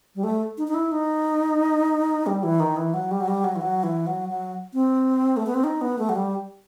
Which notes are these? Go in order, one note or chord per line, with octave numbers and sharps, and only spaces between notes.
G3
A3
D#4
D#4
E4
D#4
G3
E3
D#3
E3
F#3
G3
F#3
G3
F#3
E3
F#3
E3
F#3
F#3
C4
A3
B3
C4
D#4
B3
A3
F#3
G3